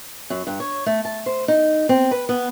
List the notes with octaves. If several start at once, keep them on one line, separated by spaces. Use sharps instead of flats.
F#2
G2
C#5
A3
A5
C5
D#4
C4
B4
B3